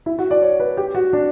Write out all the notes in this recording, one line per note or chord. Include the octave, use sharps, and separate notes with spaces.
E4
F#4
D5
C#5
B4
G4
F#4
D4